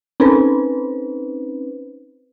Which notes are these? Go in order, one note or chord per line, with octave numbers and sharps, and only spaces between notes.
C4 C#4 D#4 B4 C5